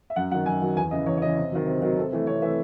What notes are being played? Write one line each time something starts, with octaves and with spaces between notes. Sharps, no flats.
E5
F#2 F#5
D#3 F#3 F#5
F#2 G#5
D#3 F#3
E2 G#5
C#3 E3 D#5
E2 C#5
C#5
C#3 E3 D#5
C3
D#3 F#3
C3
D#3 F#3
C3 A4
E3 A3
C3 C#5
E3 A3 E5